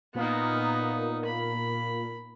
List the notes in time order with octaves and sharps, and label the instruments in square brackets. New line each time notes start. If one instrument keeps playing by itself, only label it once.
[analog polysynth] A#2 A#3 [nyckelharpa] B3 D#4
[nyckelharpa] B5